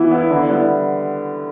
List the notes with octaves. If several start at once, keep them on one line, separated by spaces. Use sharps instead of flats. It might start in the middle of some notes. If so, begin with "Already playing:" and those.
Already playing: E3 B3 E4
B3 E4
D3
G3 B3 E4